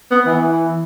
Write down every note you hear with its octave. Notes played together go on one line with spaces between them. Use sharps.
B3
E3